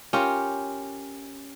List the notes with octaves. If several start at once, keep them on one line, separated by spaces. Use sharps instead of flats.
C#4 F4 G4 A#4